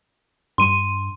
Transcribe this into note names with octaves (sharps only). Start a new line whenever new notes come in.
G2 C6 D#7